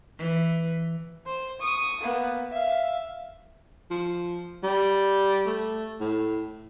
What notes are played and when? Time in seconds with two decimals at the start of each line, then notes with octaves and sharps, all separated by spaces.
0.18 E3
1.26 C5 C6
1.60 C#6 D#6
2.01 A#3 B3
2.51 E5 F5
3.91 F3
4.63 G3
5.46 A3
6.00 A2